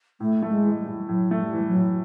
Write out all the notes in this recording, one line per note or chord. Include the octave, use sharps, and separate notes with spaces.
A2 A3
A3
G#3
E3
G3
A2
A2 F#3
A3
G3
E3
F#3
A2